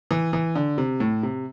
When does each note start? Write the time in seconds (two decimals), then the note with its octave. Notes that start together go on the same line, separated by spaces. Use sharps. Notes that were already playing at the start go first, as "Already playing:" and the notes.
0.11 E3
0.33 E3
0.56 D3
0.78 C3
1.00 A2
1.23 C3